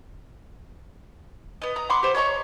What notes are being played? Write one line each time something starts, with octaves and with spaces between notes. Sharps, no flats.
B3 D#5
A#5 D#6
F#5 B5 C6 D6
G4 C5
C#5 D#5 A#5 C#6